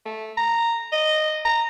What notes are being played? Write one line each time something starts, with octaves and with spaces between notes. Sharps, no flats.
A3
A#5
D#5
A#5